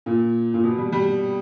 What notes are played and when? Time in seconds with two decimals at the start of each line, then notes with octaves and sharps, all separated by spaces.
0.06 A#2
0.54 A#2
0.64 B2
0.78 G3
0.92 G3